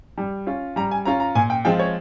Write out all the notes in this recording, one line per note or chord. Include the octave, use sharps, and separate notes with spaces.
G3
C#4 F4
G3 A#5
G#5
C#4 F4 A#5
A#5
A#2 G#5
G5
F3 G#3 C4 F4 G5
C#5